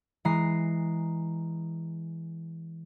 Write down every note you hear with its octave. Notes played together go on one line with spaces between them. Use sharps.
E3 G#3 A#5 C7